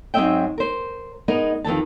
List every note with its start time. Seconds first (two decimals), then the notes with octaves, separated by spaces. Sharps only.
0.14 G#2 F#3 C4 D#5 E5 G5
0.58 A#4 C5
1.28 G#3 B3 D#4 A#4 D#5
1.65 F2 D#3 E3 A5